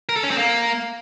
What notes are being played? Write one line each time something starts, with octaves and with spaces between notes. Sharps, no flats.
A#4
A4
C#4
C4
A#3